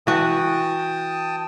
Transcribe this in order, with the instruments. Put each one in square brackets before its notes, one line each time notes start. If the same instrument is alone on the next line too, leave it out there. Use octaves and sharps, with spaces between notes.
[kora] E3 F#4 [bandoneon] G5 A5 D#6